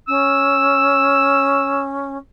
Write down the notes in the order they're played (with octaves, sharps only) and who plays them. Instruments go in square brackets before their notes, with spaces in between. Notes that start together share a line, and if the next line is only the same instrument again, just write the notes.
[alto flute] C#4 [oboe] E6